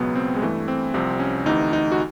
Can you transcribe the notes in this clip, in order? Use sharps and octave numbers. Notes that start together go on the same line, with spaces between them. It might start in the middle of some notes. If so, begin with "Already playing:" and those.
Already playing: C#2 B2 F#3 B3
C4
G#3
G2 E3 A3
C4
C2 C3 F3 C4
C#4
D2 C3 E3 D#4
D#4
F#4